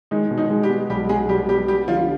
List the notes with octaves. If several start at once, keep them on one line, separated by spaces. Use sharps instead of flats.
D#3 G#3 D#4
B2
D#3 D#4
G#3
G3 G4
B3
B1 G3 G4
B1 G#3 G#4
B2 G3 G4
G3 B3 G4
G3 B3 G4
D3 F3 F4